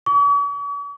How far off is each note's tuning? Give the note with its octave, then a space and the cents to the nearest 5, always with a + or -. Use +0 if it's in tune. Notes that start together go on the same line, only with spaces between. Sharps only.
C#6 +45